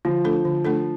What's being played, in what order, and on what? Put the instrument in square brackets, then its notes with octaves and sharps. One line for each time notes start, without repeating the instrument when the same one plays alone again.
[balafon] D3 [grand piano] F3
[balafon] A3 D4 A4
D3
A3 D4 A4